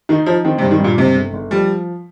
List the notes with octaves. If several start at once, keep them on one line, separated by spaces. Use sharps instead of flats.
D#3 D#4
F3 D#4
D#3 C4
C3
G2
D#3
G2 A#2
G2 C3
G1
G1
F3 G3